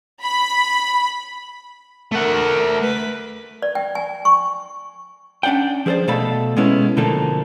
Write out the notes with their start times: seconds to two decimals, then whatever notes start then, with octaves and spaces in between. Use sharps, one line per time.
0.23 B5
2.12 A3 A#4 F#5
2.82 B4
3.62 D5
3.75 G5
3.95 G#5
4.25 C#6
5.43 C#4 D4 D5 F#5 G5
5.86 F3 G#4 A4 C5 D5
6.08 B2 A3 A4 F5 B5
6.56 B2 G#3 B3 C#4 E4
6.97 B2 D3 F3 A3 A#3 A4